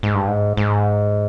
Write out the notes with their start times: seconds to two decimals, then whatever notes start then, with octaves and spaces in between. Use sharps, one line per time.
0.03 G#2
0.15 G2
0.28 G#2
0.57 G#2